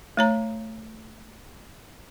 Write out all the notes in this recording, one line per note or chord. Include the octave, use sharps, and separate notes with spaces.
A3 C#5 A#5